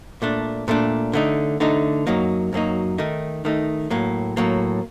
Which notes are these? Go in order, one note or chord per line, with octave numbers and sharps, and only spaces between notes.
A#2 A3 D4
A#2 A3 D4
D3 A3 D#4
D3 A3 D#4
F#2 F#3 A#3 D#4
F#2 F#3 A#3 D#4
D#3 A3 D#4
D#3 A3 D#4
A2 F#3 A#3
A2 F#3 A#3